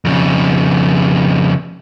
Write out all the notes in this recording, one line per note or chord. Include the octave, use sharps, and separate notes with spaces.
F2 C#3